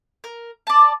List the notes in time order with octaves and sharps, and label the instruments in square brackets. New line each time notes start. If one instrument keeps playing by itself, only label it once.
[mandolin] A#4
D5 A5